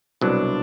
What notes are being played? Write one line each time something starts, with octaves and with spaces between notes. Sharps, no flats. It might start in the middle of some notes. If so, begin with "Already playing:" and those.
C2 B2 F#3 D4